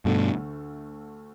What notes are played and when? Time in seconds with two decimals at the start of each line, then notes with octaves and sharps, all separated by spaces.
0.05 D2 G2 B2 D3 A3